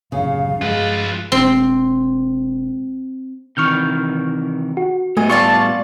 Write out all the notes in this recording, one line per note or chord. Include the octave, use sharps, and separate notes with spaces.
A1 F#2 C#3 F5
G2 F3 G#3 F4 B4
E1 C4
C3 D#3 E3 C#6 F6 G6
F#4
A2 G3 A3 B3 D#5 G#5
F4 D5 A5 C#6